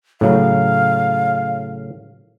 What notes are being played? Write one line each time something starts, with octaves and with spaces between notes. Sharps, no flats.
A2 C#3 F#3 F5